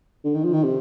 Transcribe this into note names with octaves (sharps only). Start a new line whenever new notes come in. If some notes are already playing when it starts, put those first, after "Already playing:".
D3
D#3
F3
D#3
C3